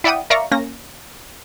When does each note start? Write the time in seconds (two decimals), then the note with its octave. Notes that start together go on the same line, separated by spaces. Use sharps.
0.04 E4 D5 E5 F#5 G5 D#6
0.30 A#4 D5 E5 F5 A#5 C#6
0.51 A#3 C#4 A#6